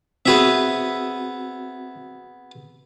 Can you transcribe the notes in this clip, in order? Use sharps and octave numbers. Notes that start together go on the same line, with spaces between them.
B3 C4 F#4 G#4 E5